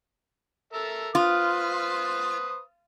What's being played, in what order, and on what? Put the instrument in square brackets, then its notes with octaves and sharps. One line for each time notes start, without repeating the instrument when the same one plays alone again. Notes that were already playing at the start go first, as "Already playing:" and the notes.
[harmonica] A4 A#4 E5
[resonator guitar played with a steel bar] F4 [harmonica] B4 C5 D#6